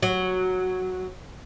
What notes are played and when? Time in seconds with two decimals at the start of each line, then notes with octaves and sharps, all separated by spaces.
0.03 F#3